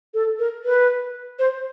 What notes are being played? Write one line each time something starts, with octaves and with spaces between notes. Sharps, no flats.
A4
A#4
B4
C5